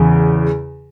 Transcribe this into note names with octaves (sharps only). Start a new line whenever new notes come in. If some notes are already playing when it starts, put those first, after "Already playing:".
Already playing: E2 C#3